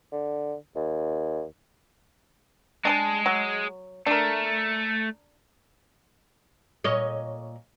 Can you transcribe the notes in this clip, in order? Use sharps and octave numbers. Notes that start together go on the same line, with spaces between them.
D3
D#2
G#3 D4 G#4 A5
F#3
A3 D4 A#4
A#2 C#5 D#5